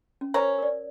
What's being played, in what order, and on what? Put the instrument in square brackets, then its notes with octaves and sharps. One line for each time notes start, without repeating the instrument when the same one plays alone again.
[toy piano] C#4
[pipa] C#4 A#5 [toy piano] A#4 C5 C#5
[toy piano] A#4 D5